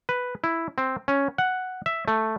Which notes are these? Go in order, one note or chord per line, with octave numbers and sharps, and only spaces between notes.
B4
E4
C4
C#4
F#5
E5
A3